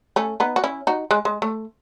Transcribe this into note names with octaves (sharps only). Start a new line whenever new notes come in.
A3 C#4
B3 D#4
F#4
C#4 E4
D#4 F#4
G#3
G#3
A3